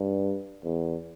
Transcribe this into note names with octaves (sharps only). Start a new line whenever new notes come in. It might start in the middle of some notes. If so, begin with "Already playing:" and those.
Already playing: G2
E2